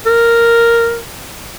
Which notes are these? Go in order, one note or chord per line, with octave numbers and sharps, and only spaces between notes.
A#4